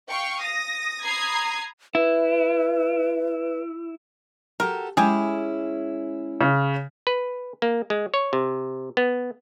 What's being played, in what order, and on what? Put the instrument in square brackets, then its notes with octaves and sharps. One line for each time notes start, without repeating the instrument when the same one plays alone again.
[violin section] F5 G5 C#6
D#6 A#6
A#5 B5 D#6 G#6 C7
[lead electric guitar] E4 [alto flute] B4
[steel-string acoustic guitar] F#4 G4 A4 [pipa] A#4
[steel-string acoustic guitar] G#3 C#4 E4 [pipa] G4 G#4
[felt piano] C#3
[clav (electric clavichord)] B4
A#3
G#3
C#5
C3
B3